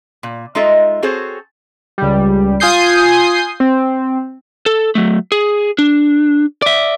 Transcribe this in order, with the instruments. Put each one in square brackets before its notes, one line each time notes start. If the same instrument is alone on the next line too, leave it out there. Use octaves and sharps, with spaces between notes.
[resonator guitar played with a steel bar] A#2
G#3 D#4 F4 A4 D#5 E5
C4 F#4 G#4 A4 C5 C#5
[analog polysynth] C#2 G3
F4 G#5 D#6 G6 C7
C4
[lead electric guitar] A4
F#3 A3
G#4
D4
D5 E5